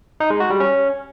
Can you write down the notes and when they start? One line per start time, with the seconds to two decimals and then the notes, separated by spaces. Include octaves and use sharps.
0.20 D#4
0.30 G#3
0.40 F#4
0.50 G3
0.60 C#4